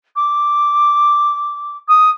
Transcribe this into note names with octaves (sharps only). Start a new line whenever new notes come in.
D6
D#6